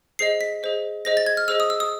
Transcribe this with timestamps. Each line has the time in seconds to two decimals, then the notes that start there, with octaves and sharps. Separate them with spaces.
0.19 G#4 C5 D#5 C7
0.41 B6
0.63 G#4 C5 D#5
1.05 G#4 C5 D#5 A#6
1.17 A6
1.26 G#6
1.37 F6
1.48 G#4 C5 D#5 E6
1.60 D#6
1.70 E6
1.80 D#6